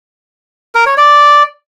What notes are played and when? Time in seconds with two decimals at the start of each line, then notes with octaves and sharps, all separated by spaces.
0.75 A#4
0.86 C#5
0.98 D5